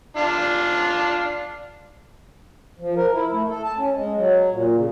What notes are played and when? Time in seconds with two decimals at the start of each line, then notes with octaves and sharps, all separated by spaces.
0.17 D4 F4
2.80 F3
2.97 A#4
3.12 E4
3.31 A3
3.49 A4
3.64 A5
3.78 C#4
3.94 G#3
4.15 F#3
4.51 A#2
4.76 C#3